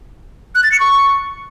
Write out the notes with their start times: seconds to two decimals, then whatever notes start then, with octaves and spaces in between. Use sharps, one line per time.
0.55 F#6
0.63 A6
0.72 C#7
0.80 C#6